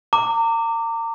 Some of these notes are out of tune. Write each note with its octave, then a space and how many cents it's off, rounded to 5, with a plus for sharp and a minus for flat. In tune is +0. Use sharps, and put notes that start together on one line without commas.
A#5 -35 D6 +0